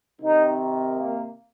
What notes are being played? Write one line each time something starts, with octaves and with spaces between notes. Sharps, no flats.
C3 D#3 D#4
A#3